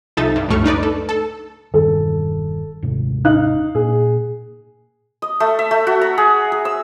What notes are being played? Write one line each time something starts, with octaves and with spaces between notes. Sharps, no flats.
C2 F3 D#4 A4 E5 A6
G2
C#2 F#2 A2 A3 C#6 F6
D4 D#4 B4 D5
A4
A4
E1 G2 D#3 A4
D#1 G#2 C3
D#4 F5 F#6
A#2 G#4
D#5
A3
E5
A3
F#4
A#5
G#4
G#4
E6